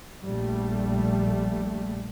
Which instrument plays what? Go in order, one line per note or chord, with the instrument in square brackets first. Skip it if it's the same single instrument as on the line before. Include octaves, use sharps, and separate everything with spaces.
[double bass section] A#1 G3 A3